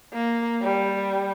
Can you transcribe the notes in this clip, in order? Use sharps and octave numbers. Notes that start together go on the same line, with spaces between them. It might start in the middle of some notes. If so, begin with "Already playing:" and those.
A#3
G3